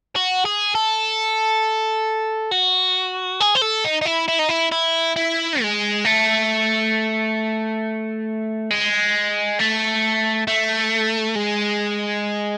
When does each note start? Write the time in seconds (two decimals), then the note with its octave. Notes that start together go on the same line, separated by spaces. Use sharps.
0.16 F#4
0.45 G#4
0.75 A4
2.51 F#4
3.40 G#4
3.55 C5
3.62 A4
3.85 D#4
4.02 D#4
4.06 E4
4.28 E4
4.39 D#4
4.49 E4
4.72 E4
5.16 E4
5.62 G#3
6.05 A3
8.70 G#3
9.59 A3
10.47 A3
11.35 G#3